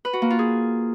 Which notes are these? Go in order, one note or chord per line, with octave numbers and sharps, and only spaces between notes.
B4
F#4
A#3
F4
G#4